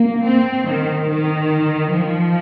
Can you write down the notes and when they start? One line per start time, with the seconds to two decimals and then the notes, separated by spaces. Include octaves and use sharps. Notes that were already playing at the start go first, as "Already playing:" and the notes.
Already playing: A#3
0.26 C4
0.68 D#3
1.10 D#3
1.93 F3